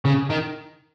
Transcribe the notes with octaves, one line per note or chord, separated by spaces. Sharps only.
C#3
D#3